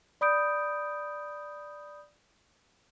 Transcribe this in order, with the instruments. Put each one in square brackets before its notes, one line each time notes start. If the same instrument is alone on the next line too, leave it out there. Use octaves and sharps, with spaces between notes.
[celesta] D5 B5 D#6 G6 D7